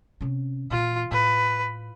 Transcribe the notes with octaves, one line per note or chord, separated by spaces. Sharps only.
C3 C#4
A#2 E3 F4
A2 B4